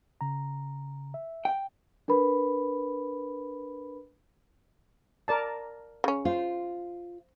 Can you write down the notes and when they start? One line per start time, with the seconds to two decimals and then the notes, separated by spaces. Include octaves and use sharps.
0.21 C#3 A#5
1.14 E5
1.45 G5
2.08 D4 A#4 B4 B5
5.28 A#4 D5 A5
6.04 C#3 C#4
6.25 F4 C5